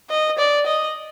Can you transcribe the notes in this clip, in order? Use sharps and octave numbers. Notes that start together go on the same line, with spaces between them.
D#5
D5
D#5